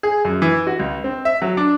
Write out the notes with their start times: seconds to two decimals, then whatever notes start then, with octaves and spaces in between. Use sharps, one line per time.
0.03 G#4
0.25 F#2
0.42 E3
0.67 F#4
0.79 C#2
1.04 C4
1.25 E5
1.42 F#3
1.57 D4